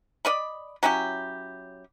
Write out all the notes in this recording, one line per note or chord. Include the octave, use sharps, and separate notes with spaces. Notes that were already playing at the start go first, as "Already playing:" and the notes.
D5 D#5 B5
F#3 C#4 E4 G4